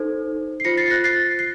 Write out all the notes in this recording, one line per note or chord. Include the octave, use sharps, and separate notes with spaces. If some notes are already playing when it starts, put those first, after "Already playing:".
Already playing: D#4 A4 C5
C7
F4 C5 A#6 C#7
A6 C7
F#6 A#6
A6 C7
C7